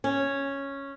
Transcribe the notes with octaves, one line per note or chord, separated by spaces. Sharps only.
C#4